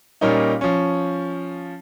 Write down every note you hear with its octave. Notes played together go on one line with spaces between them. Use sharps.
A#2 G3 A#3 C#4 D#4
F3 C#4